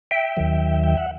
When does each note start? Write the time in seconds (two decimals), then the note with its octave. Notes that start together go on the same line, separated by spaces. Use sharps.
0.11 E5 G5
0.37 D#2 D#3 F#3
0.83 G5
0.97 F#5